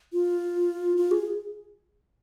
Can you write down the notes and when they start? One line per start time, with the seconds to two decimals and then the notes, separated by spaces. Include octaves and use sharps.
0.13 F4
0.97 F4
1.11 G#4